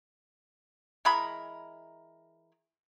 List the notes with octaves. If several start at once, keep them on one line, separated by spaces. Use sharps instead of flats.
E3 G#3 A#4 B5